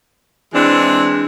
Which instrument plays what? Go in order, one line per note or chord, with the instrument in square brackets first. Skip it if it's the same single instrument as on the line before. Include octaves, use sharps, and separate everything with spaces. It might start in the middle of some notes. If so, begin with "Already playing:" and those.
[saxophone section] E3 G#3 C4 D4